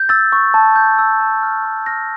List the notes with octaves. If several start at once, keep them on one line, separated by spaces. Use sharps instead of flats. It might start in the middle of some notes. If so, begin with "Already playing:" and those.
Already playing: G6
E6 A6
C#6
A5
G6
E6
A5
F6
C#6
F6 A#6